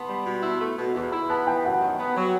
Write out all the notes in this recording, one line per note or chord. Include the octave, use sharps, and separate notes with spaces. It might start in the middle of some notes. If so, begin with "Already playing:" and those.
Already playing: B3 A5 B5 C6
G3
B2
E4
A3
B2
E2
E4 B5
B3 A5
E3 G5
F#2 F#5
D#3
B3
F#3